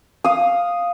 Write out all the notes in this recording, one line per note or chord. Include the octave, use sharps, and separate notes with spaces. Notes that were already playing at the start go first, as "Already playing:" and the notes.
F5 D#6